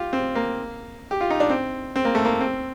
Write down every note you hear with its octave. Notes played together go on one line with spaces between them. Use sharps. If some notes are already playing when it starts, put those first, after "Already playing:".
Already playing: F4 G4
C4
A#3
G4
F4
D#4
D4
C4
C4
A#3
A3
A#3
C4